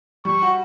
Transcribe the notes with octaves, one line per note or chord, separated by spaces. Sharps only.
G3 C#6
F#4